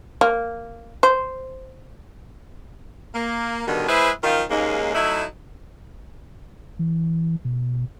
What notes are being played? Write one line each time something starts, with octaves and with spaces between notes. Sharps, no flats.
A#3
C5
A#3
G2 B2 D3 D#3
G#3 E4 G#4 B4 C5
F#2 D#3 F3 F4
D#2 G#2 C#3 G#3 A#3 D#4
F#3 A3 D#4 E4
E3
B2